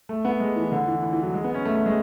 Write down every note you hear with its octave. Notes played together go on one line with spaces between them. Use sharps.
A3
B3
G#3
E3
D3
E3
E3
E3
F#3
G#3
B3
C#4
A3
A3
G#3